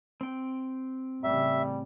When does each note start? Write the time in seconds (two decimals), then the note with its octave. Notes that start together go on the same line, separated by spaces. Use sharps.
0.21 C4 G5
1.24 A1 C#3 G3 E5